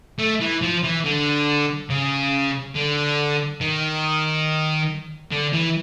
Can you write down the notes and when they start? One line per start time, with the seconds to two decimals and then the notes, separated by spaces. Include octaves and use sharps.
0.19 A3
0.41 E3
0.62 F3
0.83 E3
1.05 D3
1.90 C#3
2.75 D3
3.61 D#3
5.32 D3
5.54 E3